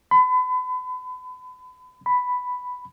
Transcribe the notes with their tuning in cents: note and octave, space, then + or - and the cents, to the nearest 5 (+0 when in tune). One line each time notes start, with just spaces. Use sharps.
B5 +35
B5 +5